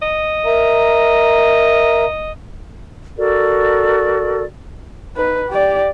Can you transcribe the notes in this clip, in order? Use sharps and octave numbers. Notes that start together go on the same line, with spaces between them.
D#5
A#4 E5 A#5
F#4 A4 A#4 D5
D#4 B4
G4 D5